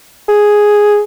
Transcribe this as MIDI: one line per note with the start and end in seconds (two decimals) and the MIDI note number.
0.28 1.01 68